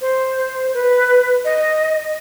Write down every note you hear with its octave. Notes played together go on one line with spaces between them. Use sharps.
C5
B4
D#5